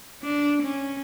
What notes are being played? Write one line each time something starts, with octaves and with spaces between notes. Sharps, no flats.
D4
C#4